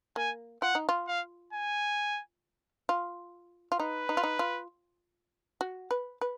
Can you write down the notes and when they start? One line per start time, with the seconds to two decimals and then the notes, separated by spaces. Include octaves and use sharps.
0.16 A#3 G#5
0.62 F4 F#5
0.75 D#4
0.89 F4
1.07 F5
1.53 G#5
2.89 F4
3.72 F4
3.79 D#4 B4
4.09 D#4
4.17 F4
4.23 D#4
4.39 F4
5.61 F#4
5.91 B4
6.21 B4